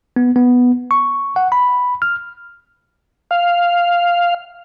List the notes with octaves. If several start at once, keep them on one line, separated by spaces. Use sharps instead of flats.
B3
B3
C#6
F#5
B5
F6
F5